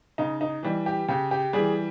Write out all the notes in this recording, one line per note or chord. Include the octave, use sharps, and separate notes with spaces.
C#3 D#4
D#4
E3 G3
G4
C#3 G4
G4
E3 G3 G#4